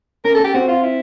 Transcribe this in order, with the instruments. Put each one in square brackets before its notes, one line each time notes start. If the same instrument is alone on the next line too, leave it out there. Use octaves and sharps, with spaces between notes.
[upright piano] C#4 [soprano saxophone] A#4
[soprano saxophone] A4
[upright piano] C#4 [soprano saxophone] G4
[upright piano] C4 [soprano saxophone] F#4
[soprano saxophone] F4
E4